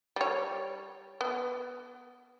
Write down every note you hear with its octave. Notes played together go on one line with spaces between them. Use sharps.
G3 C#5
B3